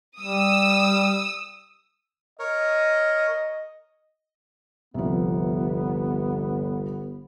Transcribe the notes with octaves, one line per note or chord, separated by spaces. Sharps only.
G3 D#6 E6
A#4 C#5 D#5
G1 C2 F3 B3